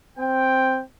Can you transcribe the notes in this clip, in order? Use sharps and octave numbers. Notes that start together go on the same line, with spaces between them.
C4 G5